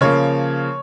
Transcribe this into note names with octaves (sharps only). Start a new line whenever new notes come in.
C#3 F3 A#3 C#5